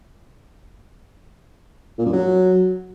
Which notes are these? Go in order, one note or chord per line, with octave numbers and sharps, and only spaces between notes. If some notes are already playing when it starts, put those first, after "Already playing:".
A#2
F#2
F#3